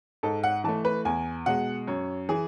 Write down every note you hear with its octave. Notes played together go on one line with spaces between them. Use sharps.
G#2 A4
F#5
E3 A3 A5
B4
E2 G#5
B2 G#3 F#5
F#2 C#5
E3 G#4